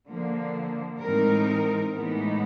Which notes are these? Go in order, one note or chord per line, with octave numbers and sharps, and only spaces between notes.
D3 F3 A#3
A2 E3 G#3 C4 D#4 A#4
A2 E3 G#3 B3 D#4